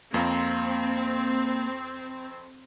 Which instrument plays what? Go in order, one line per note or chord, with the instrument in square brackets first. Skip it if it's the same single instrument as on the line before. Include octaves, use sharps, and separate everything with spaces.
[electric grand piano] F2 [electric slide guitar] A#3 F5 A#5 [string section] C4